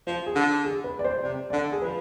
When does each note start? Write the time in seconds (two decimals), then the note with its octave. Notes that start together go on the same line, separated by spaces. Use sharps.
0.07 F3 C5
0.26 G#4
0.35 D3
0.65 G#4
0.84 B4
0.99 D5
1.04 C5
1.23 C3 D5
1.50 D3 D5
1.72 G#4
1.82 F3 B4